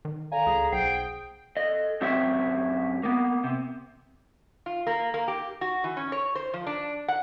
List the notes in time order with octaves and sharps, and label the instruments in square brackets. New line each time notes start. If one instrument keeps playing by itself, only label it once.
[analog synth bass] D#3
[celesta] A4 D5 F5 [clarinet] G#5 [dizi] A#5
[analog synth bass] C#2 [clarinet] G#4
[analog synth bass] B1 [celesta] C5 F#5 C7 [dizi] G5
[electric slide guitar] A4 D#5
F#2 C4 F#4 G4 C#5 E5
A#3 B3
C3
[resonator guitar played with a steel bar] F4
A#3
A#3
G4
F#4
E3
C#4
C#5
C5
F3
D4
F#5